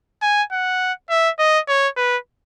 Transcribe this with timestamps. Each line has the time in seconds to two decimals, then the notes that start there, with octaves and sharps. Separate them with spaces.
0.22 G#5
0.52 F#5
1.10 E5
1.39 D#5
1.68 C#5
1.97 B4